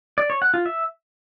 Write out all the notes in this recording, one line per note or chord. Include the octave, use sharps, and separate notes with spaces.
D5
C#5
F#5
F4
E5